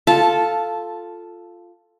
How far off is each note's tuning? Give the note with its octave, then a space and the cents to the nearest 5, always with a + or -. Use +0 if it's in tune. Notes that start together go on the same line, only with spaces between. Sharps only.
F4 +0 A4 +0 A5 -10